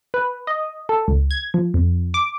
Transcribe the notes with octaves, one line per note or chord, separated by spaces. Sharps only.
B4
D#5
A4
C#2
G#6
F3
F2
D6